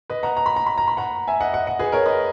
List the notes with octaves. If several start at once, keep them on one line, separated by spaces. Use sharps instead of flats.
B4 D#5
F#5 A#5
A#5
B5
A#5
B5
A#5
B5
F#5 A#5
E5 G#5
D#5 F#5
D#5 F#5
D#5 F#5
G#4 B4
A#4 C#5
B4 D#5